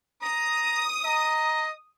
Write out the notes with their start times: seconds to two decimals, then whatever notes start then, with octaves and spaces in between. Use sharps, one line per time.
0.22 A#5 D#6
1.05 D#5 A#5